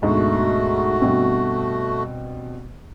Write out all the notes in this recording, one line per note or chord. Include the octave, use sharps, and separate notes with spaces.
D2 G#2 B2 A3 F#4
G2 B2 C4